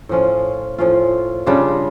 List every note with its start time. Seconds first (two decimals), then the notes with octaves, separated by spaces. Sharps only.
0.09 A2 F3 C#4 F4
0.78 A2 F3 C#4 F4
1.46 C#3 G3 D4 F4